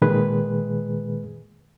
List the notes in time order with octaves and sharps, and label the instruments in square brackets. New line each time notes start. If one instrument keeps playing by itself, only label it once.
[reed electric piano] A#2 D#3 G#3 G#4 B4